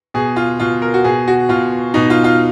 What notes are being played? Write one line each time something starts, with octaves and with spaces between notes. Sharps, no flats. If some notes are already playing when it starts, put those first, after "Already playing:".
B2 G#4
F4
B2 F4
A#4
F#4
B2 G#4
F#4
B2 F4
B2 D#4
F4
F4